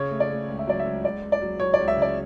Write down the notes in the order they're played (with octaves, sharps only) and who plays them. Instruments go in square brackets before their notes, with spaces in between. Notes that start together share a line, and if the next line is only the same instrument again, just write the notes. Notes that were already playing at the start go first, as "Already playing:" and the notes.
Already playing: [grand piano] C#3 [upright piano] C#5
[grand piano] A3
[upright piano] D5
[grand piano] A3
C#2
[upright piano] E5
[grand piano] F#3 [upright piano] D5
[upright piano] E5
[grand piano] C#2
[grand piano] C#2 [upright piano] D5
[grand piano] C#2
[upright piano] D5
[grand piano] F#3
[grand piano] F#3 [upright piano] C#5
[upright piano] D5
[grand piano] C#2
[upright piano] E5
[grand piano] C#3
[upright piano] D5